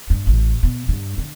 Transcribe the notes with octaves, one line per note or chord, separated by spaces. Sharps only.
G2
A1
B2
G2
D3